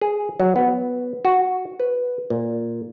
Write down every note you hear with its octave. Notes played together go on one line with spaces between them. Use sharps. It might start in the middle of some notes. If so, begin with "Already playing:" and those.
G#4
F#3
B3
F#4
B4
A#2